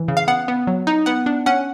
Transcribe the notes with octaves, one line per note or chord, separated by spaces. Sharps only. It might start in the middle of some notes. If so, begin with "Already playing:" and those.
Already playing: E3
C#3
F5
B3 F#5
B3
F#3
D#4
B3 F#5
D4
C#4 F#5